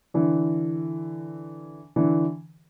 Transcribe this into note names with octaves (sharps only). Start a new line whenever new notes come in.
D3 E3
D3 E3